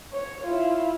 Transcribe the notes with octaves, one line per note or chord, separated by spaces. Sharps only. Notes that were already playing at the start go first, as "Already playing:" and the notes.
C#5
E4 F4